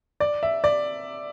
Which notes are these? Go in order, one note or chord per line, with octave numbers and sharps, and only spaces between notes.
D5
E5
D5